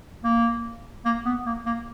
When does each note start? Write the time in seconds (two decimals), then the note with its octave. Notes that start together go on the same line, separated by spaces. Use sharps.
0.24 A#3
1.05 A#3
1.25 B3
1.46 A#3
1.66 A#3